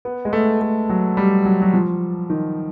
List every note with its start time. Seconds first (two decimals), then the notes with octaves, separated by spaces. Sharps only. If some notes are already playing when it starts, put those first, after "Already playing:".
0.05 B3
0.25 G#3
0.33 A3
0.61 A3
0.90 F#3
1.17 G3
1.45 F#3
1.62 F#3
1.74 F3
2.30 D#3